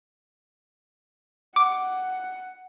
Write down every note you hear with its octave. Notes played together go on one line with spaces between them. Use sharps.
F#5 D6